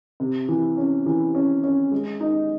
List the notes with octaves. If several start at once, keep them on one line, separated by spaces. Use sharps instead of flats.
C3
E3
C#4
E3
C#4
C#4
G#3
D#4